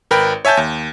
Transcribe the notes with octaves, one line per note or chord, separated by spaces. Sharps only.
G#1 A#4 B4 G5 B5
C#5 E5 G#5 A5 G6
D#2